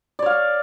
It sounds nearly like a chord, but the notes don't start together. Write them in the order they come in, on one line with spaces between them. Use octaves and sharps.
D5 C#5 F5